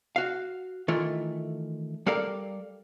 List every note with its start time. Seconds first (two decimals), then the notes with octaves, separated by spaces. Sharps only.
0.16 F#4 F5
0.88 D#3 E3 A3 F4
2.06 G3 A4 A#4 D5 F5 A#5